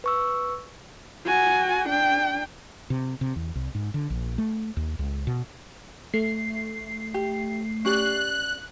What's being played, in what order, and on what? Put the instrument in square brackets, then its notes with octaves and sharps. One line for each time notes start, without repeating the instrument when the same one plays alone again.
[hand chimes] B4 C#6 E6
[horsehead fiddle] F#4 G#5
D4 G5
[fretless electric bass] C3
C3
E2
C2
G#2
D3
A#1
A3
D#2
C#2
B2
[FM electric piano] A3 C7
[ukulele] G4
[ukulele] C#4 G4 D5 [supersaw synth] F#6